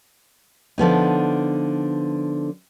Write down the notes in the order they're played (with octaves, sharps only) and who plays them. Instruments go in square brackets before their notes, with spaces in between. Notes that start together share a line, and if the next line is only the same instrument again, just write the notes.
[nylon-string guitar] D3 F3 B3 D#4